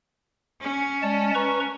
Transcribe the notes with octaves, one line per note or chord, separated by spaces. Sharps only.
C#4
G#3 D5 A5
B4 A#5 C#6